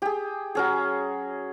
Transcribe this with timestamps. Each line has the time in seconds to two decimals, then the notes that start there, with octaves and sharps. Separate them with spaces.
0.02 G4 G#4
0.55 F#3 C#4 G#4